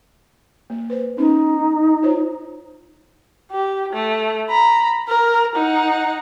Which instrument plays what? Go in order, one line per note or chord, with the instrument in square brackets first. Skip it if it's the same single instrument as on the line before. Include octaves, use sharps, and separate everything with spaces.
[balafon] A#3
B4 C5
[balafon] B3 C#4 [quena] D#4
[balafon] F4 C5 C#5
[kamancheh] G4
A3
A#5 B5
A#4
D#4 F#5